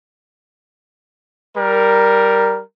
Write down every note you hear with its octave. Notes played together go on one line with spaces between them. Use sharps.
G3 A#4